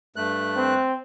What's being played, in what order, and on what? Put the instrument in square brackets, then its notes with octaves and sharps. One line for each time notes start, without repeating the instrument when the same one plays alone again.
[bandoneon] G2 A3 F#6
[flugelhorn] C4